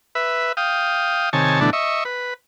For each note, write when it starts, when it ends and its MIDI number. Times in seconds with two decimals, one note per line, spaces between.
0.15 0.52 71
0.15 0.52 76
0.57 1.29 77
0.57 1.29 79
0.57 1.29 87
1.33 1.60 48
1.33 1.60 51
1.33 1.60 73
1.33 1.60 80
1.33 1.60 81
1.61 1.70 47
1.61 1.70 50
1.61 1.70 52
1.61 1.70 57
1.61 1.70 62
1.73 2.04 75
1.73 2.04 76
1.73 2.04 85
2.05 2.34 71